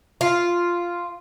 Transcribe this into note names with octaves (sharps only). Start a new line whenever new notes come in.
F4